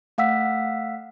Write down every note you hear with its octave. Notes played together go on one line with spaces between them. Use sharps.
A3 F5 F#5 E6 B6